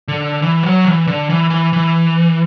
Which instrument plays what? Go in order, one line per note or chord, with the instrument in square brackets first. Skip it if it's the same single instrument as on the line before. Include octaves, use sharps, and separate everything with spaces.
[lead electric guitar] D3
E3
F#3
E3
D3
E3
E3
E3